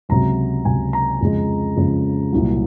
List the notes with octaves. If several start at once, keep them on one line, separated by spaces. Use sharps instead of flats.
C#2 C3 F#3 A#5
C#2 C3 F#3 G#5
A#5
F2 C#3 G#3
F2 C#3 G#3
C2 A#2 F#3